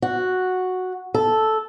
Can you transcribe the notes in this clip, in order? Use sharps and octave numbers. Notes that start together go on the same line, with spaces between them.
F#4
A4